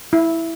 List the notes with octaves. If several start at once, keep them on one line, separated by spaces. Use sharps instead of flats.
E4